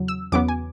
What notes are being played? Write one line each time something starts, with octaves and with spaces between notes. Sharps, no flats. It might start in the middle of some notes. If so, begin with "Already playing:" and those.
Already playing: E2 C#3 F#3
E6
E2 C#3 F#3 B3 D6
G#5